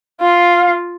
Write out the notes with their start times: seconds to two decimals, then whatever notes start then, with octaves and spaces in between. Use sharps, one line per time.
0.20 F4 F5